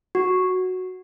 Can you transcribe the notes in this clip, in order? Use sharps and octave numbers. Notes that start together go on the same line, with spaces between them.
F#4